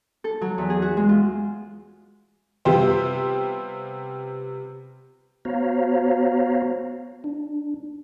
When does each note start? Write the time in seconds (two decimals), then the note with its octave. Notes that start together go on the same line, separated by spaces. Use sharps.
0.24 A4
0.41 F#3
0.58 E2
0.70 G#4
0.82 F#4
0.97 G#3
1.09 F4
2.65 C3 G3 B3 F4 G4 C5
5.45 B3 F#4 C5 C#5 F5 A#5
7.24 D4